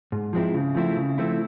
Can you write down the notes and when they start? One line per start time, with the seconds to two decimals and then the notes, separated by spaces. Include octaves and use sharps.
0.12 G#2
0.33 F3 G#3 C4 E4
0.54 C#3
0.75 F3 A3 C4 E4
0.97 C#3
1.18 F3 A3 C4 E4